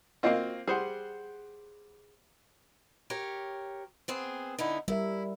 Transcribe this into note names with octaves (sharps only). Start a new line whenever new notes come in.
A#3 C4 F4 F#4 D#5 F5
G3 G#4 C5 F#5
G4 A#4 C#5
B3 C4 G#4
D3 D#4 E4
G3 E4 A#4 E5